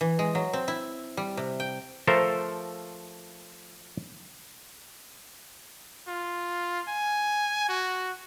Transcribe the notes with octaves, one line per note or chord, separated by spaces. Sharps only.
E3
G#3
F#3
C4
E4
G3
C3
G5
F3 A3 A4 A#4 C5
F4
G#5
F#4